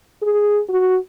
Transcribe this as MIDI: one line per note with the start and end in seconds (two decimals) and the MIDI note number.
0.22 0.61 68
0.69 0.97 66